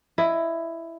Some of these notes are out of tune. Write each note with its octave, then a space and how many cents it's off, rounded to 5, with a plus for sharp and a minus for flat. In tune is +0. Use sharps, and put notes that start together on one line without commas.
E4 +10 D#5 +0